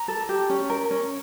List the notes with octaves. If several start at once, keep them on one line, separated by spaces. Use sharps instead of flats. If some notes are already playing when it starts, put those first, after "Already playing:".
Already playing: A#5
A4
G4
C#4
A#4
C#4